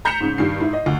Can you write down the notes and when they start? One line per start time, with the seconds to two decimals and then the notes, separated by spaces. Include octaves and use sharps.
0.05 A#5 G6 B6 C#7 E7 F7
0.20 G#2 C#3
0.38 G2 D#3 C7
0.60 G#2 E4
0.73 D#5
0.86 D2